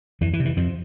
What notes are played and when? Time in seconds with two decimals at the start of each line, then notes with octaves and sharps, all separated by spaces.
0.21 F2 E3
0.33 E3
0.40 C3
0.45 E3
0.57 F2 F3